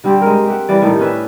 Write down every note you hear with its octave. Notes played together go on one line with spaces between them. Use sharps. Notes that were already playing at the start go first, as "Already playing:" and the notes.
D3 G3 C4 G4
G#3 A#4
G4 E5 F#5
E3 G3 D5
A2 D#3 A3
C#4 D4 B4 E5